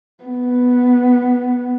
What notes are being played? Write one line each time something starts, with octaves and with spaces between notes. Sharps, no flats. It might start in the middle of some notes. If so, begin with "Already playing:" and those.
B3